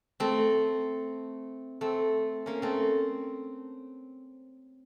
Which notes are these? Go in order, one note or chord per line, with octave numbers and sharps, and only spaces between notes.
A3 C4
A3 C4
A#3 C#4
A3 C4